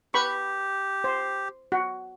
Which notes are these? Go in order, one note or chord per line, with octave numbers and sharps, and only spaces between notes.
G4 B4 B5 C#6
C5
F#4